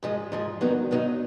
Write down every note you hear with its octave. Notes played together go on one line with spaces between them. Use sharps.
G#2 F3 G#3
G#2 F3 G#3
G2 D#3 F#3 B3 D#4
G2 D#3 F#3 B3 D#4